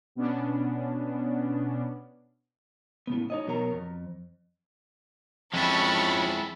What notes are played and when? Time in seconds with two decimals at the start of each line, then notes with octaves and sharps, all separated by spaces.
0.15 B2 B3 C#4 D4
3.07 A2 C#3 B3
3.30 D#4 C#5 D#5
3.47 B2 F#3 B3 A#4 C#5 A#5
3.72 F2
5.54 F2 F3 G#3 C#4 E4 A5 B5 C#6